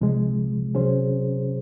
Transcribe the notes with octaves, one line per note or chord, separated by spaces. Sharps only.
C2 C3 F3 G#3
C3 F#3 C#4 G#4 C5